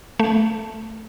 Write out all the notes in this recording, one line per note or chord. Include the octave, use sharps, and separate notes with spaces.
A3